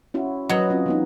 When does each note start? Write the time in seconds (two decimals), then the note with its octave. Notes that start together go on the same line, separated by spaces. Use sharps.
0.14 C#4 E4 F#4
0.49 F#3 B4 D#5
0.69 C4 C#4 F4
0.86 E3 B3 D#4